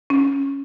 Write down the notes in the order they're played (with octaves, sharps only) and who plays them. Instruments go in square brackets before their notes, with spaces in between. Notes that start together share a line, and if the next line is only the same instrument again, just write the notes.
[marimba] C#4